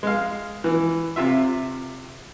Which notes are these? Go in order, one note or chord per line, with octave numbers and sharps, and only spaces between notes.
G#3 F5
E3
C3 F4 E5